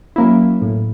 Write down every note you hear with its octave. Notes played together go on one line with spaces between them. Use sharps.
F#3 A#3 C#4 E4
A2